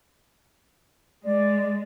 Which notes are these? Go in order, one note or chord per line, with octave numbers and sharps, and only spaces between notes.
G#3 D5